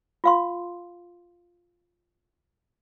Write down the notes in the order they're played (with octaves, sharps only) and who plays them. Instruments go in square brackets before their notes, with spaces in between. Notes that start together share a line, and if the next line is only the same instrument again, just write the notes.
[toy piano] F4 F5 C6